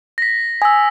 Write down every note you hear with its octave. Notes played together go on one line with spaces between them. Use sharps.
A#6 B6
G#5 D#6 E6